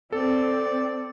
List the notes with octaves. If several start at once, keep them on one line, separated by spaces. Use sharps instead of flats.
C4 A4 D5